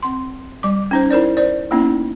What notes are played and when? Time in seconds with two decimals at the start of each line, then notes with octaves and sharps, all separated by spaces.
0.03 C4 C6
0.63 G3 D6
0.91 C#4 D#4 C5
1.10 E4 A#4 C5 D5
1.37 C5 D5
1.71 A#3 B3 C#4 D#4 E4